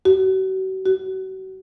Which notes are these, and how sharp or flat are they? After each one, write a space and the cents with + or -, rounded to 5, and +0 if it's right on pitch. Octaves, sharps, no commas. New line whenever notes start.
F#4 +40
F#4 +35